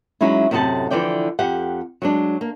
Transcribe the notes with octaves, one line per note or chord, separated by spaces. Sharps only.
F#3 G#3 C#4 D#4 E4
F#2 A2 C3 D#5 F#5 A5
D3 E3 F3 D5 G5
F2 G4 F#5
F#3 G#3 D4
A#3